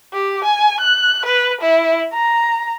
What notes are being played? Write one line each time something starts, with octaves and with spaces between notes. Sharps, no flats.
G4
G#5
F#6
B4
E4
A#5